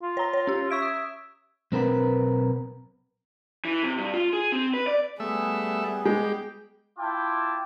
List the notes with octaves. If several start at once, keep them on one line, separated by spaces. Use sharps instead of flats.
F4
C#5 A#5
C#5
C#4 G4
E5 C#6 G#6 D7
D#6
B1 C4 A#4 B4
E3
C3
G2
F4
G#4
C4
B4
D5
G3 A3 B3 G#4 E5
G#3 G4
E4 F4 G5 A5 D6